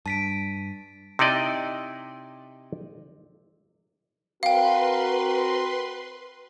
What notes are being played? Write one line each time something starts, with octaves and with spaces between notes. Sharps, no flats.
G2 A5 B6 D7
C3 D#4 E4 D5 D#5
C4 F#4 A#4 B4 F5 G5 C6